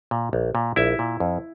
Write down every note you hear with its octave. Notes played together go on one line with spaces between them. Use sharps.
A#2
A#1
A#2
A#1 E4 E5
A#2
F2